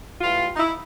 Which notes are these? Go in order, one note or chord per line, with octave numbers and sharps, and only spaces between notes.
A2 E3 G3 F4
D#4
E4